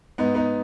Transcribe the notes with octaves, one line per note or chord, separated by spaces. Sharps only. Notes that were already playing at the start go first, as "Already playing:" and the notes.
G#2 B3 D#4
B3 D#4